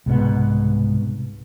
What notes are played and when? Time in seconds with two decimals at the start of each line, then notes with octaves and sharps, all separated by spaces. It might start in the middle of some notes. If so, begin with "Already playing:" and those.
0.06 C2 G#2 B2 B3